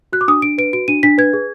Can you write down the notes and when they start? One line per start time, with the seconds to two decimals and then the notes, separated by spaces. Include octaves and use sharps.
0.12 F#4 F#6
0.21 D6
0.28 D4 D#6
0.42 D4 D7
0.58 B4 D7
0.73 F#4 D7
0.88 D4 D#7
1.03 D4 B6
1.18 B4 G#6
1.33 G#4